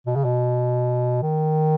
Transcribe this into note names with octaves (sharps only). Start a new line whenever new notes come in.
B2
C#3
B2
D#3